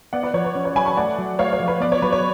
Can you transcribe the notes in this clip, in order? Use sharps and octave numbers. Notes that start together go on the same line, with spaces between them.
B3 D5 F#5
B4 D5
F3 C#5
B4
C#4
C#5
F#3 G#5 B5
A5 C#6
A3 D5 F#5
F#3
A3 C#5 F5
C#5
F3
B4
B3 D5
C#5
F#3 B4
C#5